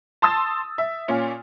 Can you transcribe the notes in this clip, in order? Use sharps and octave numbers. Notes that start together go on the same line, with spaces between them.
A5 C6 D#6 E6 A6
E5
A#2 C#4 F4